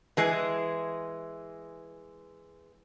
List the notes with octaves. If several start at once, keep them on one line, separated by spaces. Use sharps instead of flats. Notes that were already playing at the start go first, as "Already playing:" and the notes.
E3 G#3